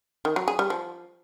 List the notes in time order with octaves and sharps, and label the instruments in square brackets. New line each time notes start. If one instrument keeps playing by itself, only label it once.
[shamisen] D#3
F#3
G#4
G3
F3